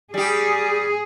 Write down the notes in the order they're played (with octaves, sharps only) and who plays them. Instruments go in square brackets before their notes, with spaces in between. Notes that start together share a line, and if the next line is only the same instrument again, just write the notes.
[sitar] G3 G4 [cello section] G#4